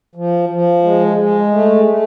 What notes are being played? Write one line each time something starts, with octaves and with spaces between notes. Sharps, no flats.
F3
F3
G#3
G#3
A3
A3